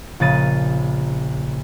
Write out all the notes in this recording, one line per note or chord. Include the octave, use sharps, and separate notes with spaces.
A#1 C#3 A6 D#7